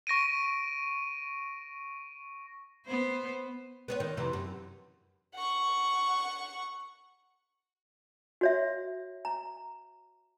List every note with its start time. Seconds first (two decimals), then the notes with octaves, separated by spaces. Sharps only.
0.07 C#6 A#6 D7 D#7
2.86 B3 C5
3.88 B3 C4 C#5
4.00 D#3
4.17 F2 C3 E3
4.33 F#2
5.35 F#5 C#6
8.41 F#4 C#5 E5
9.25 A#5